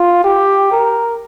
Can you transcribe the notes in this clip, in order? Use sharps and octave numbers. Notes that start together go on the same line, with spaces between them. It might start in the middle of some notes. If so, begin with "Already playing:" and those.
Already playing: F4
G4
A#4